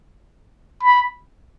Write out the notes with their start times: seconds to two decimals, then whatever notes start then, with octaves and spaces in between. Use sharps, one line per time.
0.83 B5